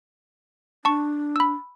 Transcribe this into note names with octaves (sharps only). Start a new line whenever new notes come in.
D4 A5 C#6
B5 E6